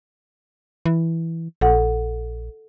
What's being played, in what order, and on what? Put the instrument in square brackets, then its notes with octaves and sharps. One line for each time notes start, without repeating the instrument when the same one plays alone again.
[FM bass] E3
[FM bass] A#1 [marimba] A4 F#5